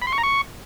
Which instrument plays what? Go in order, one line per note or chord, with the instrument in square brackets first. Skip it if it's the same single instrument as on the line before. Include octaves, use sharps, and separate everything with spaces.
[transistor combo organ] B5
C6
C#6
A#5
C#6